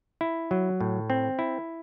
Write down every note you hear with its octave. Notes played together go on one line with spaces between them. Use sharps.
E4
F#3
A2
C4
E4